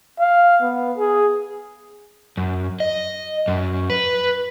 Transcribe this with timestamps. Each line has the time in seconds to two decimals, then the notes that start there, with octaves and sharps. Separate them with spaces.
0.19 F5
0.62 B3
0.97 G#4
2.37 F#2
2.80 D#5
3.48 F#2
3.90 B4